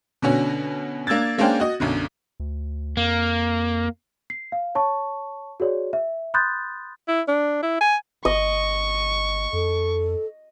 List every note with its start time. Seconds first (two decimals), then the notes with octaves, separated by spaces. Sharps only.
0.22 B2 D3 C#4 F#4
1.07 A#3 D4 E6 G#6 A6
1.38 G#3 A#3 C#4 D4 C5 G5
1.60 F#4 D#5
1.80 B1 F#2 D3
2.40 D2
2.97 F2 A#3
4.30 C7
4.52 F5
4.75 C#5 A5 C#6
5.60 F#4 G#4 C#5 D5
5.93 E5
6.34 B5 C6 D#6 F#6 G6 A6
7.08 E4
7.28 D4
7.63 E4
7.81 G#5
8.25 G1 D#5 C#6
9.53 F2 A4